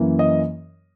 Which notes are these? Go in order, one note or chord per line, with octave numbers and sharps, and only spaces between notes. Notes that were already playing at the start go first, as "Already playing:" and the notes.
Already playing: F#2 E3 A#3
D#5